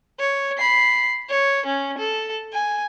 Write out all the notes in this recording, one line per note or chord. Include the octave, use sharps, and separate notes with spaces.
C#5
B5 C7
C#5
C#4
A4
G#5